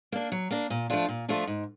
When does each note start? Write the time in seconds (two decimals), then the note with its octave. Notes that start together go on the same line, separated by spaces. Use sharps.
0.12 A#3 D4
0.32 F#3
0.51 A#3 D4
0.70 A#2
0.90 F3 A3 D4 F4
1.09 A#2
1.28 F3 A3 D4 F4
1.47 G#2